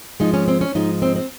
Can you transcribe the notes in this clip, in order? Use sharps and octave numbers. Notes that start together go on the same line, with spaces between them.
G#2 F3 G#3 D#4
C#4
C4
C#4
G#2 F3 G#3 D#4
C4
C4